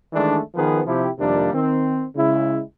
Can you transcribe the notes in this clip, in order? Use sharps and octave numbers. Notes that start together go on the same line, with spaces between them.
D#3 E3 G#3 A3 D4
D#3 F3 B3 G#4 A#4 B4
C3 F3 E4 G4
F2 C3 D#3 G3 A#3 D4
D#3 C4
C#3 G#3 E4